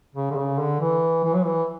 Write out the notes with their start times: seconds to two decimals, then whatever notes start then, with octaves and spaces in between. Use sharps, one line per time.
0.15 C#3
0.31 D3
0.36 C#3
0.59 D3
0.81 E3
1.24 E3
1.34 F#3
1.44 E3